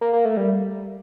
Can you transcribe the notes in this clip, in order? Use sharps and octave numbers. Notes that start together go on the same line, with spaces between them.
A#3
A#3
A3
G3